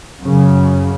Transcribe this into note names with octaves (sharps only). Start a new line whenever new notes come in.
F#2 C#3